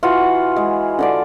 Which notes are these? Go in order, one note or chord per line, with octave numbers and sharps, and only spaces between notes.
E3 F4 F#4 F#5
G#3
D3 D4 D5